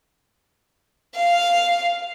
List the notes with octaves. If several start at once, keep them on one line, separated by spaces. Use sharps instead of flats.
F5